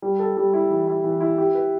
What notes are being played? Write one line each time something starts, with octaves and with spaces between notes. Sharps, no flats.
G3
A4
G3
E4
E3
E4
E3
E4
G4
B4